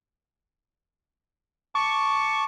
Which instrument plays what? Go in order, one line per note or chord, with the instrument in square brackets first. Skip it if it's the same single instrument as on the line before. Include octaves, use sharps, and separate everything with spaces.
[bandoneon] A5 D6 [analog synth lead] C#6